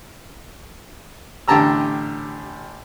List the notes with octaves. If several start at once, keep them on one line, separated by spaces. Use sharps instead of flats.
A1 D3 G4 A5 A#5 E6